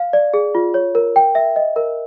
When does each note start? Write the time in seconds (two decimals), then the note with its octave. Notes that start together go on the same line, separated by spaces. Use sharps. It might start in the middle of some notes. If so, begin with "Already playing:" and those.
Already playing: F5
0.13 D5
0.34 G#4
0.55 F4
0.74 C#5
0.95 A#4
1.16 G5
1.35 E5
1.56 D#5
1.76 A#4